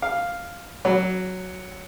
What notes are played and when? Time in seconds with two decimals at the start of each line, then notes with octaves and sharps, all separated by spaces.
0.02 F5
0.85 F#3